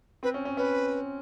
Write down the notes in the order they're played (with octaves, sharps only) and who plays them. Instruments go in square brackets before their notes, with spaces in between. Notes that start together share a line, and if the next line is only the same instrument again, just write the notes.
[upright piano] C4 [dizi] B4
[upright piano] C#4
C#4
[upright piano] C#4 [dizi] B4